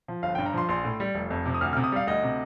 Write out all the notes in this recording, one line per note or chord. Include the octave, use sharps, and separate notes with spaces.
F3
G1 F5
G5
G2
A#5
F3 C6
A#1 C6
A2
G3
F1
F2
C3
D#6
D2 F6
F6
C3
D#6
G3 F5
D2 D#5
C3